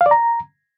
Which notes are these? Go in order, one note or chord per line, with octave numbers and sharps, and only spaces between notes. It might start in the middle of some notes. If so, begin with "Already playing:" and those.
F5
D5
A#5